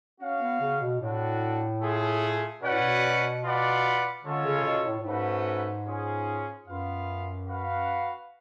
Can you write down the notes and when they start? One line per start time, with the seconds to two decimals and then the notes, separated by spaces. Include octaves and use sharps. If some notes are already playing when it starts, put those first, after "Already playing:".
0.20 C#4 F#4 C#5 F5
0.40 B3
0.60 C#3
0.80 B2
1.00 A2 D4 F#4 A4
1.82 A3 F4 G#4
2.62 B2 C#4 F#4 B4 D5 F#5
2.71 A2
2.79 B2
3.44 F4 B4 D5 F#5
4.24 D3 G#3 C#4 F4 A4 C#5
4.45 C#3
4.59 C#3
4.64 B2
4.86 A2
5.00 A2
5.05 G#2 A3 C#4 F#4 B4
5.86 C#4 F4 G#4
6.66 F#2 B3 F4 B4 F5
7.48 F#4 B4 F5